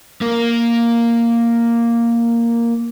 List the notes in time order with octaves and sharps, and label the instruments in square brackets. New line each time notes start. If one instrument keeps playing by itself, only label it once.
[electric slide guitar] A#3 A#4